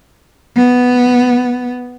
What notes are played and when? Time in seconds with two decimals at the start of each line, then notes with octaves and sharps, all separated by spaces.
0.56 B3